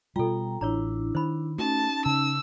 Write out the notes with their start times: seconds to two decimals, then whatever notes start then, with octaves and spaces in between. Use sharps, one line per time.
0.16 B2 G3 F4 A4 G5 A#5
0.61 A1 D4 E4 C#5 A#5
1.15 D#3 C5 B5
1.58 A3 C#4 D#4 F#4 A5
2.06 C#3 A5 E6